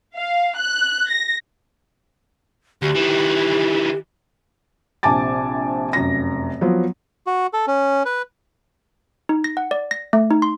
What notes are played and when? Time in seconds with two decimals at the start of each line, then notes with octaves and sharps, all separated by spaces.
0.15 F5
0.57 F#6
1.09 A#6
2.82 D2 G4
2.95 D#3 E3
5.03 A#1 C3 G#5 A5 D6 A6
5.93 F1 F#2 A#6
6.61 F3 F#3 B3
7.27 F#4
7.53 A4
7.68 C#4
8.05 B4
9.29 D#4
9.44 A#6
9.57 F#5
9.71 D5
9.91 A#6
10.13 A3
10.31 D#4
10.42 C6